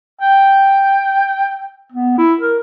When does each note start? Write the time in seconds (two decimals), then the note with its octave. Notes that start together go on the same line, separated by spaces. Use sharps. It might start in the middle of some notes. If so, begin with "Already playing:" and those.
0.21 G5
1.92 B3
2.18 E4
2.40 A#4